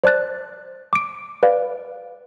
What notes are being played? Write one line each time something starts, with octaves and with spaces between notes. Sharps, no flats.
C5 D5 A5 F#6 A6
D6 D7
B4 D5 F5